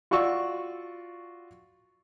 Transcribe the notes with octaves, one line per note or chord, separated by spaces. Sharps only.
F4 F#4 D5 C#6 E6